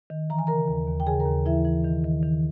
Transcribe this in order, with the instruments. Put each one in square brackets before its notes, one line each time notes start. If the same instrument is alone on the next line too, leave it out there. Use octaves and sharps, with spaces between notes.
[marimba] D#3
E3 A#5
G#5
C#3 A#4 A#5
D#2
D#2
G5
C#3 G#4 G#5
A#4 A#5
D#2
E3 E4 E5
E3
D#3
D#3
D#3